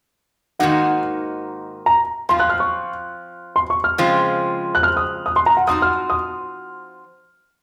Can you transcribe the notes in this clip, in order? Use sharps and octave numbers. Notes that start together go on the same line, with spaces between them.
G#2 D#3 A#3 D#4 F#4 F#5
A#5
F3 C4 F4 C6
F#6
F6
C#6
C6
C#6
F6
C#3 F3 G#3 C4 F4
F#6
F6
D#6
D#6
C6
A#5
F#5
F3 C4 D#4 F#4 D#6
F6
D#6